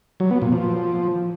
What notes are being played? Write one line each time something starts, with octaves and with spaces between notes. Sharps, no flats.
F#3
B3
A#2
F3